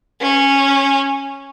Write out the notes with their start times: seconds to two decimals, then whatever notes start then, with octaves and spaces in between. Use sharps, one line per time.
0.21 C#4